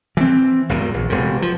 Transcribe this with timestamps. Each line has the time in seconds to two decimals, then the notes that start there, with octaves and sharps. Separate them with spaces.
0.17 E3 C4
0.69 G#1 E2 D#3
0.94 A#1
1.10 E1 C3
1.42 F3